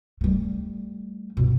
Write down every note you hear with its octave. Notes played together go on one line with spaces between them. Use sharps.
G3 A3
G2 B2